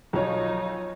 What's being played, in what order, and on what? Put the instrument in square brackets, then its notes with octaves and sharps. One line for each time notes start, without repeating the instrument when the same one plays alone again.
[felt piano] B1 [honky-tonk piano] F3 C#5 [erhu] D#4